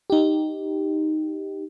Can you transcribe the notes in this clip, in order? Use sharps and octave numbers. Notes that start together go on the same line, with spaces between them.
D#4 G4